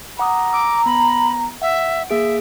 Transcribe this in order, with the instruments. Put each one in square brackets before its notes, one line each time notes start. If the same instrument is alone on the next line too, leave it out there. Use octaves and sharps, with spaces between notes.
[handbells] F#5 D6 D#6 [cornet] A#5
[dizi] D6 [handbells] E6
[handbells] B3 [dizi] B5
[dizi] E5 [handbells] F#5
[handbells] A#3 G#4 D7 [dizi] E5